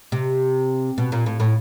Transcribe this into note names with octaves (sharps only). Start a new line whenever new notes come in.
C3
B2
A#2
A2
A2